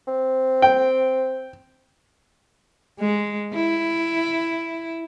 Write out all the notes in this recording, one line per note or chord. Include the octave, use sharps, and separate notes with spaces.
C4
G5
G#3
E4